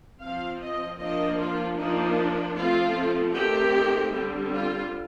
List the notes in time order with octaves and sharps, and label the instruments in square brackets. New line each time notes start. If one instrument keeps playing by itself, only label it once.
[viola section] F3 C4 F5
D#5
F3 A#3 D4 D#5
F4
F3 A#3 D4 D#4
F3 A3 C4 F4
D#3 A3 C4 G4
D3 G3 C4
F4